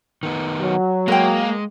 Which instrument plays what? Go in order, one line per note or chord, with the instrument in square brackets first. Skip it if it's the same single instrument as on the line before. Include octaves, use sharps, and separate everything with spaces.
[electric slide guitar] D#3 B3 D#4
[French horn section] F#3
[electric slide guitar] G#3 [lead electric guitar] A#3 [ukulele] B4 G5